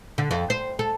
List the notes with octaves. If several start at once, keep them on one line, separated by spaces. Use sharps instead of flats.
D3
F2
C5
A4